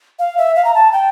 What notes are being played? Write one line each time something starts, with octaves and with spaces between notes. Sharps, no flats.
F5
E5
F5
A#5
A5
G5